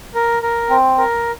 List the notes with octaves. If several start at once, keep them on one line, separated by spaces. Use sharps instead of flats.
A#4
A#4
C4
A#4